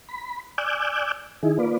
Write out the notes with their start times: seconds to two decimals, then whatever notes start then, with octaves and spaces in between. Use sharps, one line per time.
0.09 B5
0.58 D5 G#5 D6 E6 F#6 G6
1.43 D#3 D#4 E4 G#4
1.58 A#3 F4 B4 D5